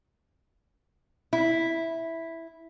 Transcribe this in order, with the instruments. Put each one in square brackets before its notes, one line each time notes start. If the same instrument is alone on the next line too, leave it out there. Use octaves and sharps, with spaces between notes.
[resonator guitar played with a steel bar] E4